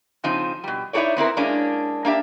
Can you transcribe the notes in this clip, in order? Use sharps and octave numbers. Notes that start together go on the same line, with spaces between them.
C#3 F3 C4 D#4
B2 G3
D#4 E4 G4 A4 C#5 D5
B3 C4 E4 A#4
G#3 A#3 C#4 D4
A#3 D4 G4 E5